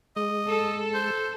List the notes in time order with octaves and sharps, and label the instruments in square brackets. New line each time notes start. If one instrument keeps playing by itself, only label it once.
[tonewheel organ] G#3 [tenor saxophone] D#5
[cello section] A4
[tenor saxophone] C5